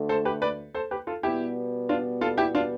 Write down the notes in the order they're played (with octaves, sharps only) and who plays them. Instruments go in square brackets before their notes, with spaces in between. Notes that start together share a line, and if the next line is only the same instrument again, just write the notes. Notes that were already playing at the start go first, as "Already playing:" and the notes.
Already playing: [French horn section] D2 D3 A3
[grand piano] A4 C5
G4 B4
B4 D5
A4 C5
G4 B4
F4 A4
[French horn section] B2 G3 B3 [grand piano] E4 G4
[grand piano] D4 F4
F4 A4
E4 G4
D4 F4